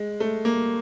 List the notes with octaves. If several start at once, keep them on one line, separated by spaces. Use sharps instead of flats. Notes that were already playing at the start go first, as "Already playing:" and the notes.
Already playing: G#3
A3
A#3